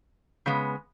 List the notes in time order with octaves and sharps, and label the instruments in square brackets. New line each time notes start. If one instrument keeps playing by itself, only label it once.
[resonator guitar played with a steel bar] C#3 G#3 B3